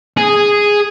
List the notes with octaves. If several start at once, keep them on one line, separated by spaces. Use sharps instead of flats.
G#4